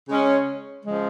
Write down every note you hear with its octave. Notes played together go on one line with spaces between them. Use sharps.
C#3 G#3 C#4
C#3 F3 G#3